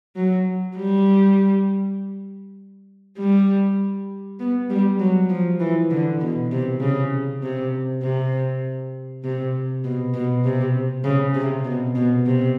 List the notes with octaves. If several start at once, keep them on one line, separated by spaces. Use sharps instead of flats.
F#3
G3
G3
B3
G3
F#3
F3
E3
D3
B2
C3
C#3
C3
C3
C3
B2
B2
C3
C#3
C3
B2
B2
C3